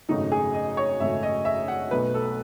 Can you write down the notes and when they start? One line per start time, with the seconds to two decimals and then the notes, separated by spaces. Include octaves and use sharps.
0.09 G#1 F#2 C#3 F#3 A3 D#4
0.32 G#4
0.54 D#5
0.77 C#5
1.00 G#1 F#2 C#3 F#3 A3 E5
1.23 D#5
1.45 E5
1.68 F#5
1.91 B1 B2 A3 B4
2.14 A4